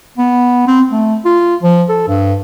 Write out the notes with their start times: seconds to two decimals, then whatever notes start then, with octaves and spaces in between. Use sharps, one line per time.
0.18 B3
0.67 C4
0.91 A3
1.25 F4
1.63 F3
1.89 A4
2.08 G2